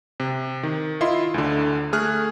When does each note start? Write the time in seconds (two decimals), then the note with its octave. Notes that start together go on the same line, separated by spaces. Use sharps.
0.20 C3
0.63 D#3
1.01 E4 F4 D#5 C6
1.34 D2 D3
1.93 A3 G#4 F6 F#6